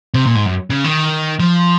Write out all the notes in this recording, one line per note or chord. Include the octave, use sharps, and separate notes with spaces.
C3
A#2
G#2
F#2
C#3
D#3
F3